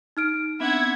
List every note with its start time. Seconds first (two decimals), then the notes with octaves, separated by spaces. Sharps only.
0.17 D#4 F6 D7
0.60 B3 C4 D4 E5 F#5 G#6